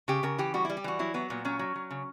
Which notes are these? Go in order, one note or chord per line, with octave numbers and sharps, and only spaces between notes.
C#3 G4
C#3 A#4
E3 G4
G3 F#4
G3 E4
G4
E3 F#4
F#3 E4
F#3 B3
A#2 B3
F#3 C#4
F#3
F#3
C#3